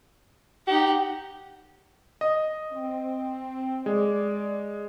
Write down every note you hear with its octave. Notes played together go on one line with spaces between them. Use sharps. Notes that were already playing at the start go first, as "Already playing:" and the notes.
D#4 G4 F#5
D#5
C4
G#3 D5